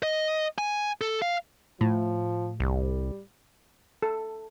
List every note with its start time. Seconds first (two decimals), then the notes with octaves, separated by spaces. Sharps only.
0.03 D#5
0.58 G#5
1.01 A4
1.22 F5
1.81 A2 F3
2.60 C2 G3
4.02 A4